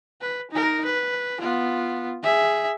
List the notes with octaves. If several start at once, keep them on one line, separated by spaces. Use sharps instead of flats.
B4
D#4 A#4
B4
B3 F4
G#4 E5